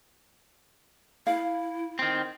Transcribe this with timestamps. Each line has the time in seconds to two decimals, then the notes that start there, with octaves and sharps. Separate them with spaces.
1.27 E4 F5
1.99 D#3 C4